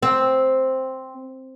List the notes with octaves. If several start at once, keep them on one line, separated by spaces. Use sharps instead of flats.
C4